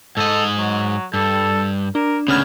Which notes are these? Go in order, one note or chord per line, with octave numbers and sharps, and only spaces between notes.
G#2 A4 D#5
F#3
G2 A4
D4 A#4
D2 C#3 B3 C#4 F6 G#6